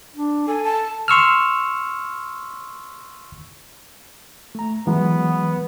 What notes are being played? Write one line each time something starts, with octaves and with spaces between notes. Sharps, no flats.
D4
A4 G#5
A5
C6 C#6 E6 F6
A3 A#5
E3 F#3 G#3 B3